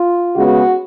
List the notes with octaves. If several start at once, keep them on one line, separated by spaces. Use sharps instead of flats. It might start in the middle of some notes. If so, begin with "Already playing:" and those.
Already playing: F4
C#3 G#3 B3 F#4